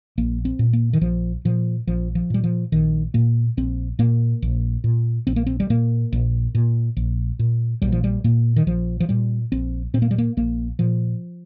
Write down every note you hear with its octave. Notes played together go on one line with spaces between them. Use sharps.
A#1 A#3
C4
A#2
A#3
D#3
A#1 F3
A#2 F3
A#1 F3
F3
A#2 G3
F3
A#1 D#3
A#2 A#3
A#1 C4
A#2 A#3
A#1
A#2
A#1 C4
A#3
C4
G3
A#2 A#3
A#1
A#2
A#1
A#2
A#1 G3
F3
G3
A#2 A#3
D#3
A#1 F3
F3
A#2 G3
A#1 C4
A#2 C4
A#3
G3
A#3
A#1 A#3
A#2 F3